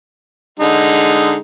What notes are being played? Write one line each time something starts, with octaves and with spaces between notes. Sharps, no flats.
D3 G#3 D#4